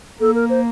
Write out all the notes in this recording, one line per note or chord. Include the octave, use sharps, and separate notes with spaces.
A#3 A4
A#4
C5